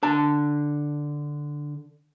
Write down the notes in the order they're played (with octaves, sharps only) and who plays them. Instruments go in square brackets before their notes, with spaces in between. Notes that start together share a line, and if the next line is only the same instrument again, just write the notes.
[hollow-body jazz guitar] D3 A5